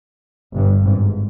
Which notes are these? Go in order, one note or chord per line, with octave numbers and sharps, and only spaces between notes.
G1 G2
G#1 G#2